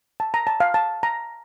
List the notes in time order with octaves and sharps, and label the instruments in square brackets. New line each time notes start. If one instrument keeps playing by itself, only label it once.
[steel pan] A5
A#5
A5
F5
A5
A#5